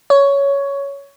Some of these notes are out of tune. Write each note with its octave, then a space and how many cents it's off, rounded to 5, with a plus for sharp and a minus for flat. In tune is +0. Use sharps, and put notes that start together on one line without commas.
C#5 +10